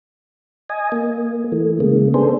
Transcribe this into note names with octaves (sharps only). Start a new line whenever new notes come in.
D#5 G#5
A#3
E3 A3
C#3 G#3 A#3
B3 D4 G#4 A4 C5